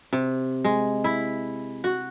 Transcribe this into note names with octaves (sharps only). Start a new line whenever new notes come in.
C3
G#3
E4
F#4